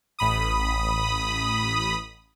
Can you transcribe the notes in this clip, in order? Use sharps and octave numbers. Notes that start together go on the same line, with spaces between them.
A1 B5 D#6